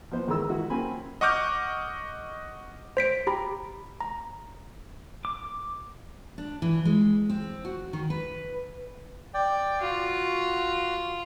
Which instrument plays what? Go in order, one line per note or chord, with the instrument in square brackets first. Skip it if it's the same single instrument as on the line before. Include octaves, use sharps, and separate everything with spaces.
[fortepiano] F3 B3 C5
E2 D#3 G#3 A#4 A#5 E6
D#3 G#3 E4 F#4
F#2 A#3 C4 G#5 B5
[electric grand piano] D#5 F#5 C#6 D6 F6 G6
[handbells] C5 B6 D7
G4 A#5 B5
A#5
[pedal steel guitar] D6
[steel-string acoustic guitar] D4
E3
G#3
C4
F#4
D#3
B4
[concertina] D5 G5
[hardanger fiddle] F4 [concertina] F#4